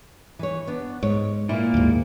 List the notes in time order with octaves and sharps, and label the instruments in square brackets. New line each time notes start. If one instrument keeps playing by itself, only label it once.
[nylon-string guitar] E3 C#5
B3 D4
[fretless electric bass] G#2 [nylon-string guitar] C#5
[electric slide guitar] A#2 A#3 [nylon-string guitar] E4
[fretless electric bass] D#2 G#2